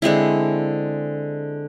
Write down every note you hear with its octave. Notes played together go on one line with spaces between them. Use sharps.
D3 G#3 C4 E4